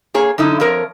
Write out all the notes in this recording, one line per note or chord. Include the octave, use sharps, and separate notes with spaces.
A#3 G#4 C#5
F#2 D3 D#4 E4
F2 F3 A#4 C#5